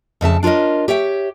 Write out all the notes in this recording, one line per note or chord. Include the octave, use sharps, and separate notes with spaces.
F2 C#3 E5 A5
D4 F4 A#4 C#5 D#5
G4 C#5 E5 G5